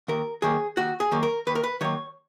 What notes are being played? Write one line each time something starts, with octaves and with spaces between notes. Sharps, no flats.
D#2 A#4
D#3 F#3 A#3 G#4
D#2 F#4
G#4
D#3 F#3 A#3
A#4
D#2 B4
A#4
B4
D#3 F#3 A#3 C#5